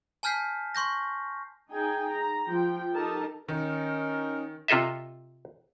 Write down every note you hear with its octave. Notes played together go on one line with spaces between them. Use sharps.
G#5 A5 F6 G6 B6 C7
C6 C#6 G6 A#6
D#4 G#4 G5 G#5
A#5
F3 G5
D#4 G4 A4 A#4 A5
D#3 C#4 D#4 A#4
C3 F4 A4 D#5 E5